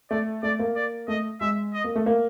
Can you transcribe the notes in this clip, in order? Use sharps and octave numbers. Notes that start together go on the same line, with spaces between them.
A3 D5
A3 D5
A#3
D5
A3 D#5
G#3 E5
D#5
A#3
A3
A#3